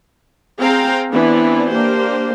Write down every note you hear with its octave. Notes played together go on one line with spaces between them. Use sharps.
C4 G#4 F5 G5 A#5
E3 B3 C4 D4 E4
A#3 D4 G4 C5